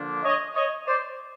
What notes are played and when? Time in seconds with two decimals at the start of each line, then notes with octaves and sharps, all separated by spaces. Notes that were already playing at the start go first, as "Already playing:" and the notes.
Already playing: D3 F3 A#3 D4
0.24 C#5 D#5
0.55 C#5 D#5
0.87 C5 D5